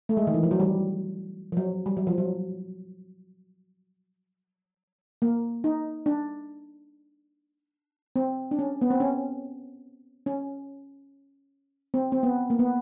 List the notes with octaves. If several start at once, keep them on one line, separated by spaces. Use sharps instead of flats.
A3
G#3
D#3
E3
F3
F#3
G3
F3
F#3
G3
F#3
F3
F#3
A#3
D#4
D4
C4
D4
C#4
B3
C4
C#4
C#4
C4
C4
B3
A#3
B3